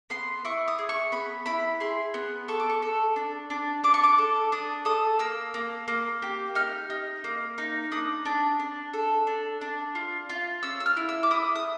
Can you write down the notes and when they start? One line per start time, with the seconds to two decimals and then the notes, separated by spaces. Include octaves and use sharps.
0.10 B3 C6
0.45 E4 C#6
0.68 D#6
0.79 G#4
0.89 C#6
1.12 B3 B5
1.46 E4 B5
1.80 G#4 C6
2.14 B3
2.48 A4 C#6
2.60 D6
2.70 C#6
2.82 A4
3.16 D4
3.50 D4
3.84 D4 D6
3.94 C#6
4.03 D6
4.18 A4
4.52 D4 D#6
4.85 A4 D#6
5.19 A#3 E6
5.54 A#3
5.88 A#3
6.22 G4
6.55 D#4 F6
6.90 D#4
7.24 A#3
7.58 D#4
7.92 D4 D#6
8.25 D4
8.60 D4
8.93 A4
9.27 D4
9.61 D4
9.95 F4
10.29 F4
10.63 C#4 E6
10.80 E6
10.86 F6
10.97 E4
11.09 E6
11.23 D6
11.31 E4 D#6
11.55 D#6